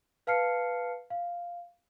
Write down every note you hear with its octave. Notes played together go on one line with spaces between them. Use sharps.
B4 F5 A5 F6 C7 C#7
F5